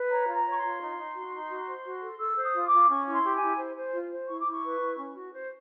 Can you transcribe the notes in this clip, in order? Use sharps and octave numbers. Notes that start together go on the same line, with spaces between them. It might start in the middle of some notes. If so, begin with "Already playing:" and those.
Already playing: B4
C#5 A#5
F4
A#5
C#5
C#6
C6
F4
D#4
D#4
F#4
D#4
F#4
C5
F#4
A4
A4 E6
C5
D#6
F4
D6
F4
C#4 C#6
E4 C#6
C6
G4
G#5
E4
C5
C5
F4
C5
E4 C#6
D6
E4
C#6
B4
E4
C#4
F#4
C5